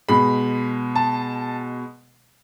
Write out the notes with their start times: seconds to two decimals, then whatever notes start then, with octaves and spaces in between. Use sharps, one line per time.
0.08 B2 G#3 B5
0.96 A5